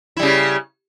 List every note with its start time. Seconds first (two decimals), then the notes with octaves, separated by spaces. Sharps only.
0.17 E4
0.20 G3
0.22 C#3